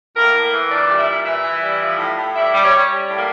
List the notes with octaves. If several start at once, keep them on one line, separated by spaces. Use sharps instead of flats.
A2 A#3 A#4
A2
E3
A#2 D4 D5
G3
E4 E5
A#2
E3 E4 E5
E3
G3
F3
A2
A2
G3 E4 E5
G3
C#4 C#5
G3
G3
A2
A#3